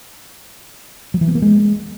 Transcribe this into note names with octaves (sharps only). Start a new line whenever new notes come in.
F#3
E3
B3
A#3
G#3